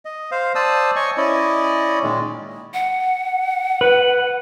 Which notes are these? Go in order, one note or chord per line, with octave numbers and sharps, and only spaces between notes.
D#5
C5 F5
C5 D5 A5 D#6 E6
C#5 D#5 G#5 C#6
C#4 E4 D5 D#5
A#2 D#3 G#3
F#5
B4